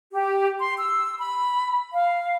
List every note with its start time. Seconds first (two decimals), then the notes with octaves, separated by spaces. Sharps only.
0.13 G4
0.60 C6
0.78 E6
1.19 B5
1.92 F5